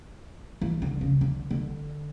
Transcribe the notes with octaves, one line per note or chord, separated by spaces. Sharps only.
E3
D3
C#3
D3
D3